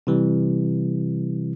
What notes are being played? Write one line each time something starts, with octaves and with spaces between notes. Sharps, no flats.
C3 E3 G3